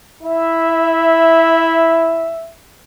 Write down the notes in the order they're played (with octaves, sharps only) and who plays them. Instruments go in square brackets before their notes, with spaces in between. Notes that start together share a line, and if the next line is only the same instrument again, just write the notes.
[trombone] E4 [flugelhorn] E5